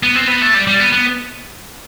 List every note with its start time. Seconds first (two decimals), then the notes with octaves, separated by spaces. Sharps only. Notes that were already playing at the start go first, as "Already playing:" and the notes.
0.03 B3
0.15 C4
0.27 B3
0.41 A3
0.54 G3
0.67 G3
0.80 B3
0.93 B3